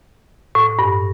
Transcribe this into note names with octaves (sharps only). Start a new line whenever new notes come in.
A2
G2